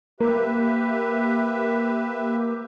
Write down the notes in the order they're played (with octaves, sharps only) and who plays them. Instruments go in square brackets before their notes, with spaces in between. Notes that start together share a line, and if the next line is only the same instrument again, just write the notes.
[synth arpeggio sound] A#3 [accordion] G4 B4 E5